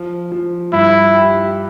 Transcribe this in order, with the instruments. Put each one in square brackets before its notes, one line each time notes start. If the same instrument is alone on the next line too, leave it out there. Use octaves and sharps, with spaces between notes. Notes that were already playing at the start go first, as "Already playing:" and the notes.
Already playing: [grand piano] F3
F3
[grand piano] G2 [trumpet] E4
[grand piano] G4